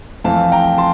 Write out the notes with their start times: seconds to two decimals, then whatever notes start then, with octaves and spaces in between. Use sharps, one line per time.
0.24 F2 E3 A3 C4 F5 A5
0.52 G5 A#5
0.78 A5 C6